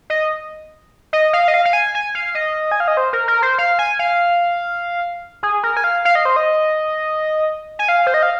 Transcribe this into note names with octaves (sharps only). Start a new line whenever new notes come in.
D#5
D#5
F5
D#5
F5
F5
G#5
G#5
F5
D#5
G#5
F5
D#5
C5
A#4
A#4
C5
F5
G#5
F5
G#4
A#4
G#5
F5
F5
D#5
C5
D#5
G#5
F5
C5
D#5
F5